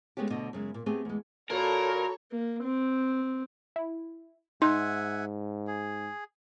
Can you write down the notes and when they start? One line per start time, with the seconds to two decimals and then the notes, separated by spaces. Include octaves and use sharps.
0.17 G#3 A3 B3 C#4 G4
0.30 D2 B2 D3 D#5
0.53 F#2 C#3 G#3
0.74 A#2
0.86 A3 B3 C4 G4 G#4 G#5
1.05 E2 G#3
1.50 A#2 F#4 A4 A#4 C#5 B5
2.32 A#3
2.64 C4
3.76 E4
4.62 G#2 D#4 E5 F#5 G#5 C6
5.67 G#4